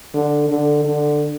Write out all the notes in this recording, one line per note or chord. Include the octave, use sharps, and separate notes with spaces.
D3
D3
D3